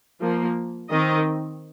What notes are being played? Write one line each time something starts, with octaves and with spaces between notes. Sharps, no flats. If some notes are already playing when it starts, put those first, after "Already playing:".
F3 A#3
D#3 C4 D#5